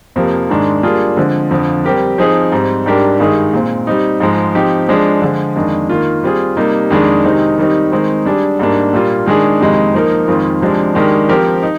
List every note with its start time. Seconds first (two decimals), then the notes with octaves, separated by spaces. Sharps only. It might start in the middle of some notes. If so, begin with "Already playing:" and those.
0.16 F2 C3 F3 A#3
0.50 G#2 D#3 G#3 D4
0.83 G3 A#3 D4 F4 G#4
1.17 D3 F3 G#3 C4
1.51 F2 D3 F3
1.85 G3 C4 G4 A#4
2.18 F3 C4 D#4 G#4
2.52 G#2 G3 C4
2.86 G#2 G3 D4 G4 A#4
3.20 G2 D#3 G#3 D#4 G#4
3.53 A#2 G#3 C4
3.87 G3 C4 D#4
4.20 G#2 F3 G#3
4.55 F3 C4 D#4 G4
4.88 F3 G#3 D4 G#4
5.22 D3 F3 G#3
5.56 F2 D#3 G#3 D4
5.89 D#3 A#3 F4
6.23 G3 C4 F4 G#4
6.57 C3 G3 A#3 D#4
6.90 F2 D#3 G#3 D4 G#4
7.24 C3 D#3 G#3 C4 D#4
7.58 D#3 G3 C4 D#4
7.92 D#3 G#3 C4 D#4
8.25 G3 D4 G#4
8.59 G#2 G3 A#3 D4
8.93 A#2 G3 A#3 F4
9.26 D#3 G#3 D4 G#4
9.61 F2 C3 D#3 G#3 D#4
9.94 F3 A#3 D#4 A#4
10.28 F2 D#3 G#3 C4 F4
10.61 C3 F3 G#3 D4
10.95 D#3 G#3 D4 G4 A#4
11.29 F3 C4 G4 A#4
11.63 D#4